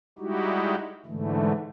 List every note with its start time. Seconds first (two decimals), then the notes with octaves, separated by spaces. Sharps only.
0.19 G3 G#3 D#4 E4 F#4 G4
1.06 G#2 D3 E3 A3